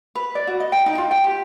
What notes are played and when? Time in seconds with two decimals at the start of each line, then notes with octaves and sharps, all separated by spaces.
0.15 B4
0.35 D5
0.47 F#4
0.60 D#5
0.72 G5
0.86 D#4
0.98 F4
1.11 G5
1.24 G4